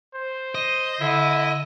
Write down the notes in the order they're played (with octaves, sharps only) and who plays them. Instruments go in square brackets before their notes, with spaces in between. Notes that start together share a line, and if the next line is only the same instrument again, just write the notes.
[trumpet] C5
[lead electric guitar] D#5
[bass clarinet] D3 [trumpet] E4